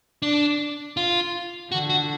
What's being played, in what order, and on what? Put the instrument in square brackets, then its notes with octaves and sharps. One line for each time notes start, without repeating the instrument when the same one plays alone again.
[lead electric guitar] D4
F4
[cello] D3 [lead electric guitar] F#4
[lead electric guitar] F#4